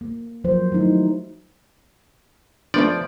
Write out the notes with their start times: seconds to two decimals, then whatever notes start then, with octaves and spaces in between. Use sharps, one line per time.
0.01 A#3
0.44 F3 F#3 A#4 C5
0.71 D#3 F#3 A3 D#4 E4
2.74 F3 A3 B3 D4 D5